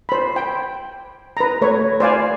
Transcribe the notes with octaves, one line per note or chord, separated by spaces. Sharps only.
C5 B5
G5
B4 A#5
A3 B4 C#5
C5 D5 F5 G#5